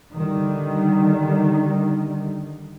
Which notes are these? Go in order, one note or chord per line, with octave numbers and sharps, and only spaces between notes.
D3 D#3 G3